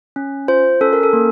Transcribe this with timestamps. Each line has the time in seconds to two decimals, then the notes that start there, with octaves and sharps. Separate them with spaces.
0.16 C#4
0.48 F4 C5
0.81 C#4 A4
0.93 A#4
1.03 A4
1.13 A#3